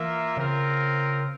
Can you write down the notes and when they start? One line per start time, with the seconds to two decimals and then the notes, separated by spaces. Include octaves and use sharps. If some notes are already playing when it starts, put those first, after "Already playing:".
Already playing: E3 A#3 F4 A#4 E5
0.37 C#3 C4 F4 A#4